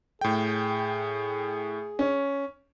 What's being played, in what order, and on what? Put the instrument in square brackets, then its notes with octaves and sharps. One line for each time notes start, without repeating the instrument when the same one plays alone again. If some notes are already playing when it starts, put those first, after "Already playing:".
[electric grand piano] A2 G5 [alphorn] G#4
[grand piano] C#4